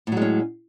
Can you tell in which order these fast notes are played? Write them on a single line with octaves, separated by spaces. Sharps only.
A2 F#3 G#3 C#4